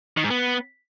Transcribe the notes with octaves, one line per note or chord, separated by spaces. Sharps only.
D#3
G#2
B3